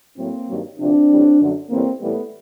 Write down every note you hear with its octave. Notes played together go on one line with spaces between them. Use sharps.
A2 F#3 A#3 C4
G2 D#3 F#3
D2 C3 F3 C4 D4
A2 E3 G3
F#2 D3 F#3
A2 E3 G3 A#3 C4
A2 E3 G3 A3 B3